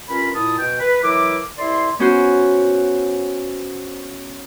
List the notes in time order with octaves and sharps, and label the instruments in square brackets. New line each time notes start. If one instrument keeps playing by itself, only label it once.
[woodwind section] G2 C#4 F4 A#4 B5
A#2 E4 A5 D#6
B2 G5
B4
E3 F#3 E4 A#4 E5 D6
C2 E4 D5 E5 C6
[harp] B3 C#4 F#4 C5